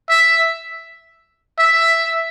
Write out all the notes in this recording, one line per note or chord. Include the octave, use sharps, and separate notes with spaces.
E5
E5